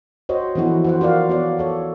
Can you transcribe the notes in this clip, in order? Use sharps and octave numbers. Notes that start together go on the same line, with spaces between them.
F#4 C5 C#5 D#5
E3 F3 B3 E4 F#4 A4
F#4 C5 F#5
F4 F#4 A#4 D5 F5
B3 F#4 C#5 D5
F4 A4 C#5